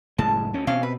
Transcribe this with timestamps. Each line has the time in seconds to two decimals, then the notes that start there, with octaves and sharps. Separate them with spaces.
0.18 F#1 A2 G#3 A5
0.53 D2 C#4
0.67 B2 E3 C4 C#4 F5
0.83 B4